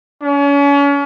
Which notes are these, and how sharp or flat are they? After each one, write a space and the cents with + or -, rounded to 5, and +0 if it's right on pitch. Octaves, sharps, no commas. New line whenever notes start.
C#4 +35